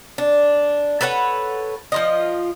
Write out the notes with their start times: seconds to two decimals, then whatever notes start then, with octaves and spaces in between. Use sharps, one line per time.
0.18 D4
1.01 A4 B4 C#5 F#5
1.92 F3 F4 D#5